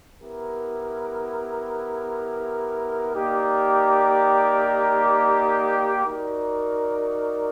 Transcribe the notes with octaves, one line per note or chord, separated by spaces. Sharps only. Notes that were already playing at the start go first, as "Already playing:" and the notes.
B3 E4 G4 A#4
A#3 D#4 G4 A#4 D5
D#4 F#4 A#4 D5